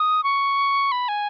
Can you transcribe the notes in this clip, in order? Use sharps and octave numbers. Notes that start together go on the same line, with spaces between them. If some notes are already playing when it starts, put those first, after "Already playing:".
Already playing: D#6
C#6
B5
G#5